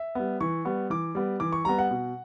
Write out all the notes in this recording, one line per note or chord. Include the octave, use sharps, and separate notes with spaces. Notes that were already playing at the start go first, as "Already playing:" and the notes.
Already playing: E5
G3 B3
E3 C#6
G3 B3
E3 D6
G3 B3
E3 D6
C#6
G3 B3 A#5
F#5
B2